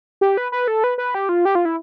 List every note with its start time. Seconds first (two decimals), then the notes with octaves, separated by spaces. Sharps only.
0.21 G4
0.37 B4
0.52 B4
0.68 A4
0.84 B4
0.98 B4
1.15 G4
1.29 F4
1.45 G4
1.55 F4
1.65 E4